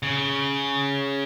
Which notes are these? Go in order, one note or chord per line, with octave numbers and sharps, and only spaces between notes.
C#3